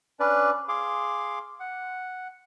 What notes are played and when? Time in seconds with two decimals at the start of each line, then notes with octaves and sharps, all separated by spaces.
0.20 C#4 D4 B4 D5
0.68 G#4 F5 C6 D6
1.60 F#5